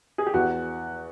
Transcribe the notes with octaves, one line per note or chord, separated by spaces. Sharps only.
G#4
G4
E2 F#4